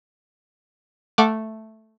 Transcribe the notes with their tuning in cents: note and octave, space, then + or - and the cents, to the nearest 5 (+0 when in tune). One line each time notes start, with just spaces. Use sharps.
A3 +0 F#5 -20 D6 +0